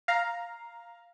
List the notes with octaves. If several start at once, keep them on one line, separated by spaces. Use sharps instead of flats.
F5 A#5